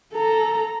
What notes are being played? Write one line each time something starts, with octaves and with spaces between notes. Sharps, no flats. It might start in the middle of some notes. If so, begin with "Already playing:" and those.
A4 A#5